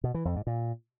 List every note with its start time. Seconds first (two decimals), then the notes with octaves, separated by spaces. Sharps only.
0.04 B2
0.14 E3
0.25 F2
0.36 G#2
0.47 A#2